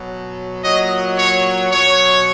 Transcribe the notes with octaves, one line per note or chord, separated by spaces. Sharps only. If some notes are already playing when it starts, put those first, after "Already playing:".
Already playing: B2 F#3
A#2 F#3 D#5
C#5
B2 F#3 C#5